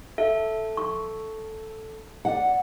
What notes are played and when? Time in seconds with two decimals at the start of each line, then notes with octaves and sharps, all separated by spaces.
0.18 A4 E5
0.77 C#6
2.25 D5 F#5